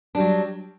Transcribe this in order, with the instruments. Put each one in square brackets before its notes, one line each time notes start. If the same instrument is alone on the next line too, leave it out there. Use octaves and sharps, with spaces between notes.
[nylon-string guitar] D4
G3
F#3